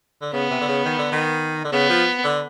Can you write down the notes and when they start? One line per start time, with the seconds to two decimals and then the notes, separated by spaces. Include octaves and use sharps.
0.21 D3
0.33 C#3 B3
0.50 C3
0.61 D3
0.68 C#3
0.85 D#3
0.98 D3
1.12 D#3
1.64 D3
1.72 C#3 B3
1.90 F3
2.24 D3